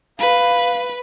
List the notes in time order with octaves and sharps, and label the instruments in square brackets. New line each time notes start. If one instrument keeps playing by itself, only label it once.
[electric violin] B4 [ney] F5